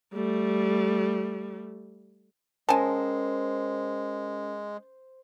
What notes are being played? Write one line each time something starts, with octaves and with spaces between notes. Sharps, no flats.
G3 A3
G#3 C#4 A#4 C5 G#5 A5